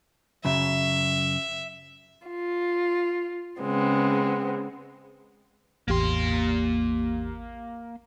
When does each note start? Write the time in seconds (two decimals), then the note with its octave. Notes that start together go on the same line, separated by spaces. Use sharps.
0.45 F#2 C#3 E5
2.27 F4
3.61 C#3 G#3 B3 C4
5.88 A1 E2 A#3 G4 C6